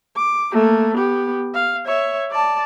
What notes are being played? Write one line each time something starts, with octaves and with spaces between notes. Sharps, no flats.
D6
A3 A#3
B3 G4
F5
C#5 E5
D5 A5